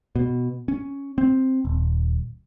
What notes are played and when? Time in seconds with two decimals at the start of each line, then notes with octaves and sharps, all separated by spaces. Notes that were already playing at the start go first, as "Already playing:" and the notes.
0.16 B2
0.68 C#4
1.18 C4
1.65 D#1